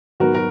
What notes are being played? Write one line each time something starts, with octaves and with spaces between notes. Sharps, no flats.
G#2 F#3 B3 F#4 A#4
F#4 A#4